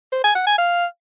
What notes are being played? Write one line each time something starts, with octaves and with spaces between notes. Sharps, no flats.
C5
G#5
F#5
G#5
F5